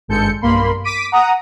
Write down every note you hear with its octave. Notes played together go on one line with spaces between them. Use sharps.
G#1 G2 G#3 A4 G6 C#7
B1 G2 A#3 B5 C6
D6 B6 D7 D#7
F#5 A#5 D#6